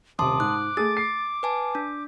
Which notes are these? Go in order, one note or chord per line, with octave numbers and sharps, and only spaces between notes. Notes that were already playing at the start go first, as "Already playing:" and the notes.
D#1 C3 A5 C6 D6 D#6
G#2 F#6
A3 G#4 A6
C7
B4 G#5 A5
D4